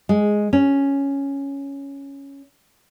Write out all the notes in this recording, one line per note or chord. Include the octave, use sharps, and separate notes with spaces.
G#3
C#4